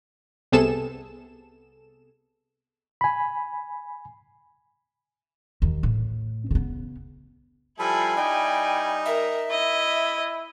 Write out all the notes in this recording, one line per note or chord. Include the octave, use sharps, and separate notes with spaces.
C2 C3 B3 G#4 A4 E7
G#5 B5
D#2
A2
C#3 B3
F3 G3 E4 A4 G#5 B5
G3 D#4 G5
A#4 E5
E4 D#5